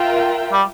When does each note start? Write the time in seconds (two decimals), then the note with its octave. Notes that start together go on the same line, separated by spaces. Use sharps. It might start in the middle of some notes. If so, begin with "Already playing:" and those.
Already playing: F4 A#4 E5 G5
0.53 G3